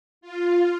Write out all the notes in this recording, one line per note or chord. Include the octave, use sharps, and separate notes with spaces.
F4